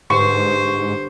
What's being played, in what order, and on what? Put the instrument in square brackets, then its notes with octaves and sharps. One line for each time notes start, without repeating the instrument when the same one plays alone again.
[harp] G1 [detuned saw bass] G#2 [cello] C5 [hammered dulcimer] C#6